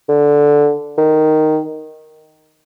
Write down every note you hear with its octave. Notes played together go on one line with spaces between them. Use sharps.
D3
D#3